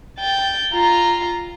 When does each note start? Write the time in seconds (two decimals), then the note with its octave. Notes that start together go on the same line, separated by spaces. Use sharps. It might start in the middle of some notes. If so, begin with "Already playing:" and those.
0.19 G5 A6
0.74 F4 A#5